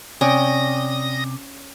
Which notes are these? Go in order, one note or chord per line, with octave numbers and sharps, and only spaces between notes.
C3 C#4 D5 G5 D#6 A#6